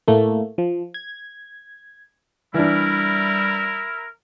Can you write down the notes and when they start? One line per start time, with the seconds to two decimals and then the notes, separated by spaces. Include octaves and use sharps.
0.08 A2 A3 A#3
0.58 F3
0.94 G#6
2.54 E3 G3 D4 E4 A#4